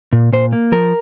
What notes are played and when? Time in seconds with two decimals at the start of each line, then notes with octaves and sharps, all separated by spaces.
0.13 A#2
0.33 A#2 C5
0.53 A#3
0.72 F3 A#4